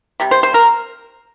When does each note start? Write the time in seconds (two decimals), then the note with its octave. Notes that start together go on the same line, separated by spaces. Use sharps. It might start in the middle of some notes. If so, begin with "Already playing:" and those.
0.20 C3 G3
0.31 C5
0.43 C5
0.54 A#4